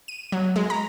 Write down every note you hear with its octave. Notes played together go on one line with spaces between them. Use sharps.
D#7
F#3
G#3
A#5